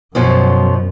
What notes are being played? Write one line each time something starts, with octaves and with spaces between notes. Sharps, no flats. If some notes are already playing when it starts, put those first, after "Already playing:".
F#2 B2 F3 C#4